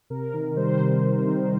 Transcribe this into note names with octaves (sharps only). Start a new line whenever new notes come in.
C3 A#4
D#3
G3 C5
C3
C3
D#3